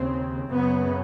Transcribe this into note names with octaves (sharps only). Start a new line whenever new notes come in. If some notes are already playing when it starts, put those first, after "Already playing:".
Already playing: D#2 C#3 C4
F#2 C#3 B3